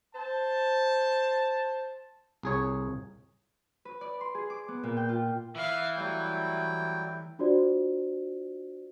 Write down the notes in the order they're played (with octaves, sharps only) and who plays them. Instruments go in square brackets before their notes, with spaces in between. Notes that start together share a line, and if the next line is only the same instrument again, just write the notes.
[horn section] C5 A5
[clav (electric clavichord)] C2 G#4 C#5
[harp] B4
D5
C6
G#4
D6
B3
A#2
G5
F4
[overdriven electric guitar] E3 [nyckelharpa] E5 F5
[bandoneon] F#3 G3 E4 [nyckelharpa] A3 [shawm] G5
[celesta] D4 F4 F#4 C5 D5